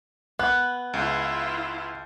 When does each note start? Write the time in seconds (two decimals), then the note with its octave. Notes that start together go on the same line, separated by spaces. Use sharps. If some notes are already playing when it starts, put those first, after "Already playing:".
0.39 B3 F#6
0.94 C#2 E4 F4